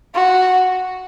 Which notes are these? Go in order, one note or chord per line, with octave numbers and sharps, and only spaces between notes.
F#4